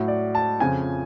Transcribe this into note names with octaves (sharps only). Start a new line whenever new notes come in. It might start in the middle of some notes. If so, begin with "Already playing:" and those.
Already playing: A2 F#3
D5
A5
F2 C#3 F3 G#5